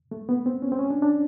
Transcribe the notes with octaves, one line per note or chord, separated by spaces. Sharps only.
A3
B3
C4
C#4
C4
C#4
D4
D4